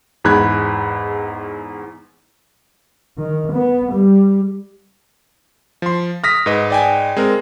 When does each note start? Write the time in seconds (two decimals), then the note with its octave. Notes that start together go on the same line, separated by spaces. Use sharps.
0.24 E2 G#2 B5 F#6 G#6
3.18 D#3
3.53 B3
3.92 G3
5.82 F3 C6
6.24 D#6 F6 A#6 B6
6.46 G#2 B4 D#5
6.70 D5 G5 G#5
7.17 G#3 C4 A#4